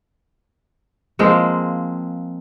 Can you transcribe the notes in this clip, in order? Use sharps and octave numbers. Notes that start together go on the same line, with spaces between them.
F3 G#3 A#3 C4